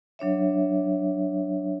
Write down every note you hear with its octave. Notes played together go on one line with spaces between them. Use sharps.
F#3 D4 C#5 E5